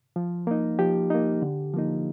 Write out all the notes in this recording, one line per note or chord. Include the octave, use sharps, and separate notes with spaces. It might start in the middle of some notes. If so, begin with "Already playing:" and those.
F3
A#3 D#4
F3 G4
A#3 D#4
D3
F3 A#3 D#4